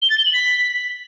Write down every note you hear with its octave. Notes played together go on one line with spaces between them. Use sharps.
G7
A6
G7
F#7
B6